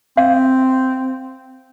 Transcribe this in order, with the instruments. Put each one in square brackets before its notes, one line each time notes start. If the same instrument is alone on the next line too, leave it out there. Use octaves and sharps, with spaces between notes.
[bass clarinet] C4 [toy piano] F5